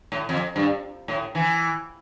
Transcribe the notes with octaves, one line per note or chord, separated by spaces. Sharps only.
A2
F2
G2
A2
E3